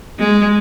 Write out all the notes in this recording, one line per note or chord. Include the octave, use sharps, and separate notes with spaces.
G#3